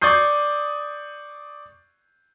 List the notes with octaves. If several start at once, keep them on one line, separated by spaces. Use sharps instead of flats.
D5 C#6 D#6 G6 C7